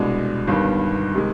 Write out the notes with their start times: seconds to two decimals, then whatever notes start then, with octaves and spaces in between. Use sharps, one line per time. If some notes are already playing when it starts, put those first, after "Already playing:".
Already playing: C2 B2 G#3 D4
0.47 G1 G2 D#3 B3
1.15 C3 D#3 G#3